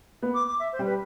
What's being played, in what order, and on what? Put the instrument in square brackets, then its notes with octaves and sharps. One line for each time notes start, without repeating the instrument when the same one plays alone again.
[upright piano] B3
[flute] D6
D6
E5
C5
[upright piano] G3
[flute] B4